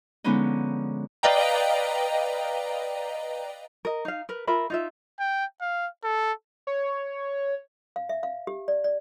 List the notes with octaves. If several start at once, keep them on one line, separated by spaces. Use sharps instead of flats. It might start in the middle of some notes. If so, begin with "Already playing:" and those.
D3 F3 G#3 B3 C#4 D#4
B4 D5 D#5 F5 G5 A#5
A#4 D#5
D#4 F5
A#4 B4
F4 A#4 E5 B5
D#4 F4 E5
G5
F5
A4
C#5
F5
E5
F5
G4
D5
D5